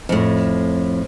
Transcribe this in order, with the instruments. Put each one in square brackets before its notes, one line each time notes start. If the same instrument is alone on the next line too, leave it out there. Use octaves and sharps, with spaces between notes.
[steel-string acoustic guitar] F2 A2